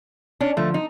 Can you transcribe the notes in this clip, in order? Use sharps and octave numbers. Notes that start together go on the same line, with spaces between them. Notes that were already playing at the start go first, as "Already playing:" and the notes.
C#4 D4
D3 F3 A3 F4
D#4